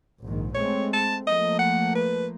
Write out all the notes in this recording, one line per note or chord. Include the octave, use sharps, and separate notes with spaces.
A#1 G#2 D#3
G#3 A3 C4 C#5
A5
F3 A3 A#3 D#5
F#5
B4